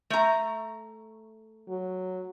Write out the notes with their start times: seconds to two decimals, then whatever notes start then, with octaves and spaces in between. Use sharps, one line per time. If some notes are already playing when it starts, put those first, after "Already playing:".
0.10 A3 A#5
1.69 F#3